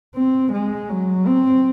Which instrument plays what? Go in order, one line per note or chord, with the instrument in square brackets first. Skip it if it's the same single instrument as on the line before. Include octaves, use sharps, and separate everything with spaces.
[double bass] C4
G#3
F#3
C4